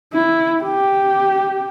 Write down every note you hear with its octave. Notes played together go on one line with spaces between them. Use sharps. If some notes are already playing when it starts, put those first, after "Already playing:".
E4
G4